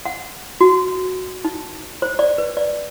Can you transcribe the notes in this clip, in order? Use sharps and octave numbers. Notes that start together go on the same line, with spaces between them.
F#5
F#4
D#4
C5
D5
B4
D5